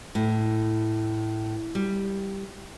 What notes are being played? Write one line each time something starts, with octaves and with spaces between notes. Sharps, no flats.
A2
G3